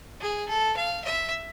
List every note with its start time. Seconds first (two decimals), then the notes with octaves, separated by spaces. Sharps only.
0.21 G#4
0.48 A4
0.77 F5
1.05 E5